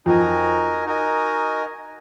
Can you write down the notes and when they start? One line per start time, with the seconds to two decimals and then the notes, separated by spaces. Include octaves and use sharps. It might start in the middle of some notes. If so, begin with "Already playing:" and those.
0.05 F2 D#4 F#4 A#4 D#5 G#5
0.86 D#4 F#4 A#4 D#5 G#5